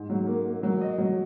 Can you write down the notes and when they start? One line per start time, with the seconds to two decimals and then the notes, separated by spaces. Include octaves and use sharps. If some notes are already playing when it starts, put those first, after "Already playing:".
Already playing: G#2
0.10 F#3
0.27 A#3
0.46 A#3
0.63 F#3
0.81 D#5
0.98 F#3